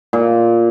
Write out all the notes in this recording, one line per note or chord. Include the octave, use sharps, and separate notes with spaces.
A#2